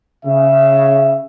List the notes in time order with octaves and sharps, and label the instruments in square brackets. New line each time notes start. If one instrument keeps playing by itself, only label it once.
[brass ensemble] C#3 [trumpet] E5